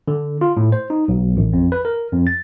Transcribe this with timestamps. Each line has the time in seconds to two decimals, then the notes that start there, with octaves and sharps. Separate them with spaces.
0.08 D3
0.41 F4
0.57 A2
0.72 C5
0.90 D#4
1.08 B1
1.37 A1
1.53 F2
1.72 B4
1.85 A#4
2.12 F2
2.27 A6